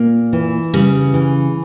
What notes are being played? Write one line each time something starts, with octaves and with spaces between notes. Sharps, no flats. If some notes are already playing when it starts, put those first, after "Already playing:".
Already playing: A#2 A#3
E3
C#3 G3
E3